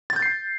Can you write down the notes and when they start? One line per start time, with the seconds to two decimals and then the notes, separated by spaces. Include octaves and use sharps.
0.10 A6
0.16 G6
0.22 C7